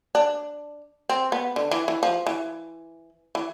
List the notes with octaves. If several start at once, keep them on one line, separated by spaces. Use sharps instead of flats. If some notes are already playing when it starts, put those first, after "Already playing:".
D4
C4
B3
D3
E3
E3
F3
E3
E3